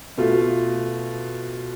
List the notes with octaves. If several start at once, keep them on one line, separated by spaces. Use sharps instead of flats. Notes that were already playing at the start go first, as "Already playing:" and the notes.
B2 A3 F4